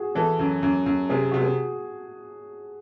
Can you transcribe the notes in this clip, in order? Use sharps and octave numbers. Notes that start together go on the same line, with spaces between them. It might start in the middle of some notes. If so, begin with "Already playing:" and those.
Already playing: F#4 G#4
E3 A4
F#2
F#2
F#2
C3 G#4
C3 F#4
G#4